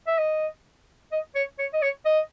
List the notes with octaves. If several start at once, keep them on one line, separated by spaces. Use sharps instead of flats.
E5
D#5
D#5
C#5
C#5
D#5
C#5
D#5